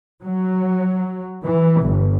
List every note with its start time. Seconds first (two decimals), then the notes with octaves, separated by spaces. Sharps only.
0.23 F#3
1.43 E3
1.82 G1